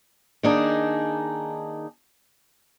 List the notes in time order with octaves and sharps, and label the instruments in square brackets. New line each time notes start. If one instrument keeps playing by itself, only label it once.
[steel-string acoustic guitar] D#3 A#3 D4 D#4 G#4